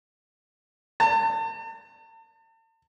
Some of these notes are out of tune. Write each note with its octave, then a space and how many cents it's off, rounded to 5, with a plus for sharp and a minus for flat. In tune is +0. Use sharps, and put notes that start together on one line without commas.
A5 +40